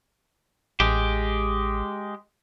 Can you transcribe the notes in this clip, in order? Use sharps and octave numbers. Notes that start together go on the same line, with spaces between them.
A1 G#3 G4